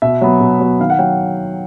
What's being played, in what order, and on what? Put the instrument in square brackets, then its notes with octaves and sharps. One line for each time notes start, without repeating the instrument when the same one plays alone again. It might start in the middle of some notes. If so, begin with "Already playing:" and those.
[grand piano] B2 E5
F#3 B3
B2
F#3 B3
D#3 F5
F#5
F#3 G5